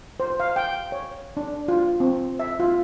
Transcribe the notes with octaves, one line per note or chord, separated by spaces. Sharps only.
C5
F5
G5
C#5
D4
F4
C4
E5
F4